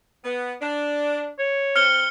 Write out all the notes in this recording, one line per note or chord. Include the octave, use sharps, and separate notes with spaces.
B3
D4
C#5
C4 F6 C#7 G7